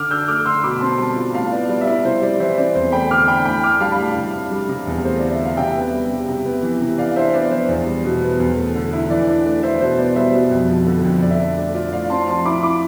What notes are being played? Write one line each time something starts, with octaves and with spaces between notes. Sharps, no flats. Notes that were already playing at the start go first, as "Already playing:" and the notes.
Already playing: D3 D6 F6
D4 E6 G6
A3 D6 F6
D3 C6 E6
B2 B5 D6
C4 A5 C6
G3 A5 C6
F4
A2 F5 A5
B3 D5
G3 D5
E5
E4 D5
C3 C5
G3 D5
E3 C5 E5
C4 D5
E2 C5
A3 G5 B5
D3 D6 F6
D4 G5 B5
A2 G5 B5
D4 D6 F6
G3 F5 A5
B5
A2 F5 A5
C3
D4
G3
C3
E2
A3 C5
D3 D5
E5
D4
F5
C3 E5 G5
B3
G3
C3
C3
B3
E3
C3
E3 D5 F5
D4 C5 E5
B3 D5
E3 C5
E2
G3
B2
B3
E2
A3
D3
E4
E3 D5
D4 D5
A3 D5
E3 C5 E5
B2 C5
B3 D5
G3 C5 E5
B2
F2
F3
D3
F2
D3 D5
E5
D4 D5
A3 D5
F4 D5
A2 D5 F5
C4 A5 C6
F3 A5 C6
E4 B5 D6
B5 D6